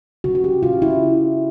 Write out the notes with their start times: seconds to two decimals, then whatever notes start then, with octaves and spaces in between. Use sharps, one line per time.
0.24 C#3 F#4
0.35 F#4
0.44 G4
0.63 C#3 F4
0.82 E4